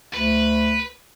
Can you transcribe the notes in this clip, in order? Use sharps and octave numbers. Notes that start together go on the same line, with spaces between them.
D2 B4